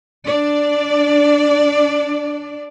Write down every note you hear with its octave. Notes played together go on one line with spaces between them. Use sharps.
D4 D5